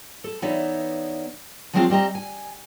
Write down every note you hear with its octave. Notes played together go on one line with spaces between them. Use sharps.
A4
E3 B3 D#4 C#5 D5 E5
F3 F#3 G#3 C4 D#4 F4
G3 C4 D#5 A#5
G#5